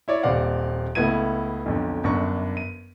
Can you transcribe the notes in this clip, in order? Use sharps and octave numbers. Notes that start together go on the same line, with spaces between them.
E4 C#5 D5
D#1 C4 D5 F5 F#5
C#2 A3 B3 E4 G#6 D#7
B1 F2 D3
G1 F#2 D4 C#6
D#7